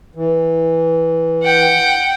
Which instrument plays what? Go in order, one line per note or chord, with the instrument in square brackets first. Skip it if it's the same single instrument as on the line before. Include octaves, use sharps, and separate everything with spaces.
[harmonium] E3
[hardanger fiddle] F#5 G5